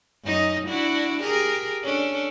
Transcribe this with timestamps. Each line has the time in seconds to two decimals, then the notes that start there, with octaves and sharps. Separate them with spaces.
0.25 F#2 D#4 D#5
0.68 D4 E4 F#4
1.21 G4 G#4 A#4
1.84 C#4 D4 A4